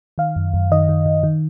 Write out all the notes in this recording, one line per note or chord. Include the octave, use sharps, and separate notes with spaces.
D#3 F5
F#2
F#2
D#3 D#5
D#3
D#3
D#3